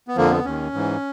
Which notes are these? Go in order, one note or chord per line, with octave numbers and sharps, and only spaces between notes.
B3
F2 D3 F3 A#3
B3
D#2 D#3 C#4
G#2 E3